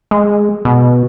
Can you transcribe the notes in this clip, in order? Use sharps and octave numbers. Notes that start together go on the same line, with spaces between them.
G#3
B2